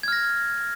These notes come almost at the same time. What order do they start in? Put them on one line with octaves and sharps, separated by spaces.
G#6 F6 A#6